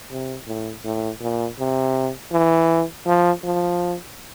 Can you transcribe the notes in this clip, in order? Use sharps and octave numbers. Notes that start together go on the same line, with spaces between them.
C3
A2
A2
A#2
C3
E3
F3
F3